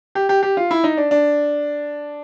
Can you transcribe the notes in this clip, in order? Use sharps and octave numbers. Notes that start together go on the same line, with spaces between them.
G4
G4
G4
F4
E4
D#4
D4
D4